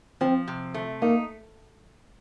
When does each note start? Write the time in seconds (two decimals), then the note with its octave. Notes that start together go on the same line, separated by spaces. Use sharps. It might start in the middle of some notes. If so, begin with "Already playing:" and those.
0.21 F3 C4
0.48 C3
0.74 A3
1.02 A#3 D#4